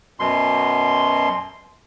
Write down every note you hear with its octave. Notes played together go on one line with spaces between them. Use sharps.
F#2 B2 C6